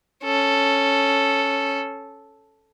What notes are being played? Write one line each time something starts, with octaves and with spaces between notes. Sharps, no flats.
C#4 A4